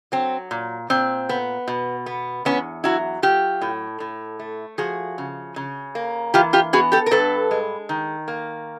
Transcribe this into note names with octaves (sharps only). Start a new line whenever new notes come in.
F#3 C4
A#2
A#2 C4
B3
B2
B3
E2 B3 C#4
F#3 E4 F#4
F#3 F4 G4
A2
A2
A3
F3 F#4 G#4
C#3
C#3
A#3
E3 F4 G4
F4 G4
B3 F#4 G#4
G4 A4
A#4
G2 A4 B4
G#3
D#3
A#3